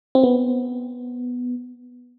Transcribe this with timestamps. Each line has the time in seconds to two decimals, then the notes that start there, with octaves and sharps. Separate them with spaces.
0.15 C4
0.23 B3